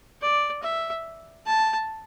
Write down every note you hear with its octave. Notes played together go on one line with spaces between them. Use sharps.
D5
E5
A5